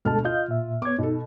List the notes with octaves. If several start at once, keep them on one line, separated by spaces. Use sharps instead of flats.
D2 B2 G#3 A4 A5 F6
F4 D#5 F5 G6
A#2 E5
B3 C#5 D6 G#6
B2 D#4 A4